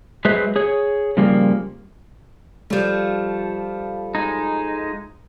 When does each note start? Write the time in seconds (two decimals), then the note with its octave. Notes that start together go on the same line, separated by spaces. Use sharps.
0.25 F#3 G#3 G#4 B4 C5 E5
0.56 G#4 C#5
1.17 C#3 F3 G3 A#3
2.70 F3 G3 A3
4.15 G#3 D#4